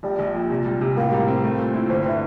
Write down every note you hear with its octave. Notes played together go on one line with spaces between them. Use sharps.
A#1 G3
A#1
A#2
C3
G3
C3
A2 A#3
G3
C4
A3
A#2
E4
G1 C4
D3 E4